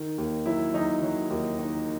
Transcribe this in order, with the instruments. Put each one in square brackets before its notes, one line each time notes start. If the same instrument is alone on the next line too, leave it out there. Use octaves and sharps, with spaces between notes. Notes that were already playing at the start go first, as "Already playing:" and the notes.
Already playing: [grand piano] D#3
D#2
F#3 E4
F#3 D#4
F#3
D#2
D#3